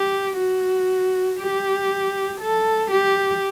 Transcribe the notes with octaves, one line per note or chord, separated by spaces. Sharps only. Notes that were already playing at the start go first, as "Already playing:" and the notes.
Already playing: G4
F#4
G4
A4
G4